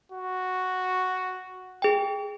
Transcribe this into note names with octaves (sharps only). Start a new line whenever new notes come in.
F#4
G#4 G5